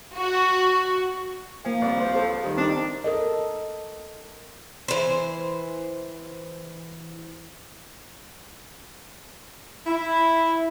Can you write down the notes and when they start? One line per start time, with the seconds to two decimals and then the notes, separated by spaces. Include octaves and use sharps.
0.16 F#4
1.65 F3 A#3 G#5
1.81 C2 B4 D5
2.00 C5
2.15 A4 C5
2.43 D#3 G3
2.57 C4 D4 D#4
3.04 A4 A#4 D#5
4.88 E3 C5
9.86 E4